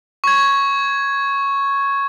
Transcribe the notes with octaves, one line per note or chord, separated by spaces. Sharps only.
C#6 G#6